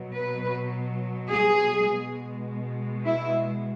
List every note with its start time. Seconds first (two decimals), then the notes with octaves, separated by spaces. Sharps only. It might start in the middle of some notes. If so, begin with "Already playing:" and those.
Already playing: B2 F#3
0.14 B4
1.31 G#4
1.89 B2 G#3
3.06 E4